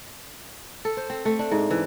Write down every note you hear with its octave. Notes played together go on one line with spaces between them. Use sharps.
A4
C5
C4
A3
D4
G#2
E3